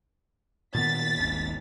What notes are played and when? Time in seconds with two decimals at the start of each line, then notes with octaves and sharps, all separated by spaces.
0.75 A#2 D#3 B3 A6 B6
1.18 D#1 G#1